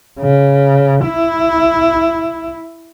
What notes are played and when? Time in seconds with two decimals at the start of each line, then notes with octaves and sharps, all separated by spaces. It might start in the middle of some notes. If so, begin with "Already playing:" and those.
0.20 C#3
1.05 E4